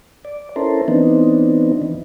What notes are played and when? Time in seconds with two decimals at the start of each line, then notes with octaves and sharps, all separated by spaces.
0.25 D5
0.56 C#4 E4 A4 A#4 C5
0.88 E3 B3 C4 D4 D#4
1.82 E3